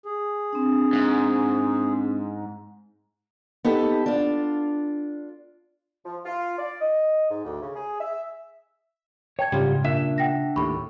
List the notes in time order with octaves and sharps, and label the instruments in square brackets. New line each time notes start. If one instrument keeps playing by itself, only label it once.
[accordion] G#4
[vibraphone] C4 D4
[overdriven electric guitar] G#2
[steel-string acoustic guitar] B3 D#4 G4 A4
D4 F4
[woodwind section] F3
F4
D5
D#5
G#2
D2
C#3
G#4
E5
[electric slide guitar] C#5 [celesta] G5 A5 G#6
[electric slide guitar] G#2 [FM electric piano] C#3 [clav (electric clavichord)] G3 F4
[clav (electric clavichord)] A#2 [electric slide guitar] D4 E5
[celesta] F#5 G5 A#6
[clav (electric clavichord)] D#2 A2 [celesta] B5 C#6